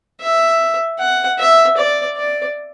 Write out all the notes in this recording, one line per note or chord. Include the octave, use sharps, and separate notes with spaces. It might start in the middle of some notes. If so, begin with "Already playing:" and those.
E5
F#5
E5
D5
D5